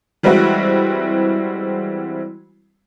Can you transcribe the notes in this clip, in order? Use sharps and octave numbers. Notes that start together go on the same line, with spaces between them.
E3 G3 G#3 C4 E4 F#4